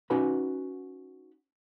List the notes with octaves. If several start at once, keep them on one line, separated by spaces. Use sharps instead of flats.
C#4 D#4 F#4 B4 F#5 B5